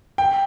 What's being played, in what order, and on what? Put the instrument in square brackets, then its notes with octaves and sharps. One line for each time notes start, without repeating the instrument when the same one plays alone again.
[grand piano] G5